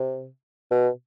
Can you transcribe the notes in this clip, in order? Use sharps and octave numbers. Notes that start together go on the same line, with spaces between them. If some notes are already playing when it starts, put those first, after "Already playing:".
Already playing: C3
B2